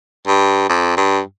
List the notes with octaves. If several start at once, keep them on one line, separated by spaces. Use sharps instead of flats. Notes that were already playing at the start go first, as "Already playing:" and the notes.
G2
F2
G2